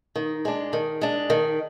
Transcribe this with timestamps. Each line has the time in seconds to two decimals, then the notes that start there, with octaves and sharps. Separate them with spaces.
0.16 D#3
0.45 G#3 D4
0.73 D#3
1.02 G#3 D4
1.30 D#3